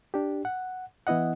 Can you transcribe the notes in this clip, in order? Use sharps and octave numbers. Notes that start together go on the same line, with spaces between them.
D4 G4
F#5
E3 B3 E4 D#5 F#5